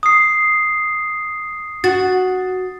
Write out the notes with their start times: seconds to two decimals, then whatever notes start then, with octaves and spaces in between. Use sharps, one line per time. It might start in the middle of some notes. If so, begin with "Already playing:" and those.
0.03 D#6 C7
1.84 F#4 A6